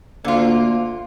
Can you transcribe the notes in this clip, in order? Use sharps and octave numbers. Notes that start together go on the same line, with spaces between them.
D2 D3 A#3 F4